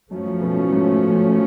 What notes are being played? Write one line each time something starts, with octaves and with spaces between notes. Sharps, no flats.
F#2 F3 A3 C#4
F#2
B2
A2
G#2